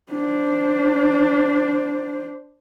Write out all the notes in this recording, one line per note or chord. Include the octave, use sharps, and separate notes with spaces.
D4 C5